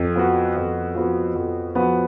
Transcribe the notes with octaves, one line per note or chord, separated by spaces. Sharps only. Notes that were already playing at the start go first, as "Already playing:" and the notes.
Already playing: F2
F3 B3 F#4
F2
F3 B3 F#4
F2
F3 B3 F#4